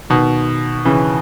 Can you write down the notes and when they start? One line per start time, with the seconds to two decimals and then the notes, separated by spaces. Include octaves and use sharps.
0.10 B2 D#3
0.85 C#3 E3